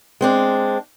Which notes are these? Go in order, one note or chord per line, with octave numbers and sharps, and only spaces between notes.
G#3 C4 D4